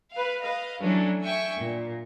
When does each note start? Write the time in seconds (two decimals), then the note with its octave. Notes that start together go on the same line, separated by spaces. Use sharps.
0.13 B4 F5
0.43 B4 D#5 F5
0.82 E3 F#3 A3 C#4 D4
1.23 E5 G5 G#5 C#6
1.58 A#2